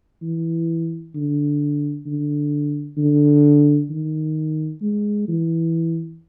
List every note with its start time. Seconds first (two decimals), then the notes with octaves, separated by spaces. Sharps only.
0.22 E3
1.15 D3
2.06 D3
2.98 D3
3.90 D#3
4.82 G#3
5.28 E3